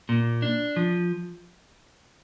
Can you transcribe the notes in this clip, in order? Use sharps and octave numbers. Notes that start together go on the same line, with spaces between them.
A#2
D4
F3